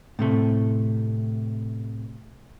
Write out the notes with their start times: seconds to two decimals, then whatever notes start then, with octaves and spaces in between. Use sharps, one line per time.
0.19 A2 C3 A3